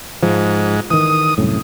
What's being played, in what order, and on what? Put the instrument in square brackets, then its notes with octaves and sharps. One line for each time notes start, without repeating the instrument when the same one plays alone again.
[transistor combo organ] G#2 [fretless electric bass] F3
[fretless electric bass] D#3 E3 [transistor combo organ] D#6
[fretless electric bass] C2 F#2 A2